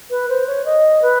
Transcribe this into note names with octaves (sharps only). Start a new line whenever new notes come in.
B4
C5
C#5
D#5
B4